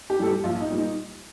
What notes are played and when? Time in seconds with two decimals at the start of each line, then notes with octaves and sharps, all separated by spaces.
0.10 G4
0.19 A2 G3 A4
0.26 G4
0.44 A#1 F4
0.61 D#4
0.70 A#2 G3
0.78 D#4